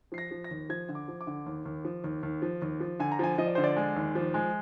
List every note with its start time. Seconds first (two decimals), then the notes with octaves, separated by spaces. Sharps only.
0.12 F3 C7
0.18 A#6
0.31 F3
0.44 A#6
0.51 D#2
0.69 F3 G#6
0.89 D3
0.95 D6
1.08 F3
1.21 D6
1.27 D3
1.46 D#2
1.65 D#2
1.85 F3
2.04 D#2
2.23 D#2
2.42 F3
2.62 D#2
2.80 F3
3.00 D3 G#5
3.12 A#5
3.19 F3 G#5
3.38 F3 D#5
3.47 D5
3.55 D3 C5
3.64 D5
3.76 G#3
3.96 D#2
4.15 F3
4.34 G#3